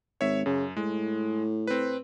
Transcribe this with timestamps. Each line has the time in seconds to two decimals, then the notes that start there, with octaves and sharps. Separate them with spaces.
0.21 G#1 C#5 E5
0.46 F#2 C#3
0.77 A2 G#3
1.67 C4 B4